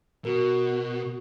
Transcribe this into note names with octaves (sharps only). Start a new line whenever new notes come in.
B2 F#4 A#4